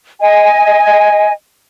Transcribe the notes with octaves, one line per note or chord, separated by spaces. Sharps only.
D#5 G#5